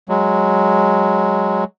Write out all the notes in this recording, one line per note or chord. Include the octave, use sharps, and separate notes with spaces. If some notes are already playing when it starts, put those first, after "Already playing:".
F#3 G#3